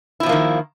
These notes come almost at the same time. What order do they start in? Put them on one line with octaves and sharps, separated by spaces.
E4 B2 F3 A#3 D#3